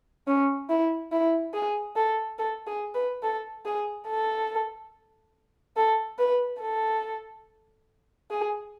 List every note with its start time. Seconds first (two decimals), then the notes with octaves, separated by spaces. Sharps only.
0.27 C#4
0.70 E4
1.12 E4
1.54 G#4
1.96 A4
2.39 A4
2.67 G#4
2.95 B4
3.23 A4
3.65 G#4
4.08 A4
5.77 A4
6.19 B4
6.61 A4
8.31 G#4